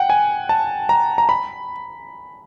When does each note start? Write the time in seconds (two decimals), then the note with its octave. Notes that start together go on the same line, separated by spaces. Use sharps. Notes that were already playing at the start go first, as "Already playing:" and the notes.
Already playing: F#5 G5
0.10 G#5
0.49 A5
0.89 A#5
1.18 A#5
1.29 B5